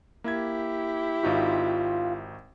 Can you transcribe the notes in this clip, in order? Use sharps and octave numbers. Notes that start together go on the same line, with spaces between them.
A#3 E4 G4 G#6
G#1 D#4 F4 F#4